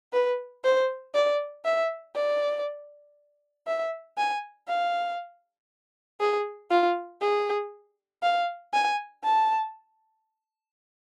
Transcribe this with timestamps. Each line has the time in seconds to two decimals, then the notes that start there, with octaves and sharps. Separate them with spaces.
0.13 B4
0.64 C5
1.15 D5
1.65 E5
2.16 D5
3.67 E5
4.18 G#5
4.68 F5
6.21 G#4
6.71 F4
7.21 G#4
8.23 F5
8.73 G#5
9.24 A5